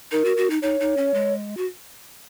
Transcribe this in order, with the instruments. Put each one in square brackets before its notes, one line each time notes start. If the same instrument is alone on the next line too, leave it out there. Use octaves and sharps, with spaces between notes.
[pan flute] D#4 [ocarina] A#4
[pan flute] F#4
F#4
D#4
[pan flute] D#4 [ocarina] C#5
[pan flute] D#4
C#4
G#3
F#4